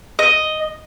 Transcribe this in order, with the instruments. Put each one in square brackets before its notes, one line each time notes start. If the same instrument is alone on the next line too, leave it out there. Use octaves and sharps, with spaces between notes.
[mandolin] D#5